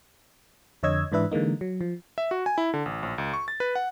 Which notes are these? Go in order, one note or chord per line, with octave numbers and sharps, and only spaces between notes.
F2 D3 C#5 D#5 E6 G#6
G#2 E3 D4 B4 E5
D3 E3 G#3 A#3 D#4
F#3
F3
E5
F#4
G#5
E4
D3
A1
A#1
C#2
C#6
A6
B4
F#5